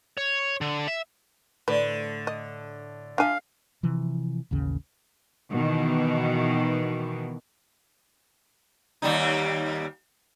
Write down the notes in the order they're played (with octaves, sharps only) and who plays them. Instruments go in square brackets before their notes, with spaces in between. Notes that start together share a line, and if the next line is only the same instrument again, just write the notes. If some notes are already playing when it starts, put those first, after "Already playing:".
[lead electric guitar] C#5
D3
E5
[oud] A2 C5 D5 [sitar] D3 [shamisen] B4
[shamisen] D#5
[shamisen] D4 G#5 [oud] F4 E5 [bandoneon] F5
[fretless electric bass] C3 E3 F3
A1 D#2 C#3
[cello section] B2 D#3 E3
[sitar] D#2 G3 D#4